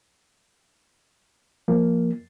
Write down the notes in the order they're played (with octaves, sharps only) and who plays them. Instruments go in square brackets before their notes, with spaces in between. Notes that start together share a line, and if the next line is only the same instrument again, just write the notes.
[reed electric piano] F3 A#3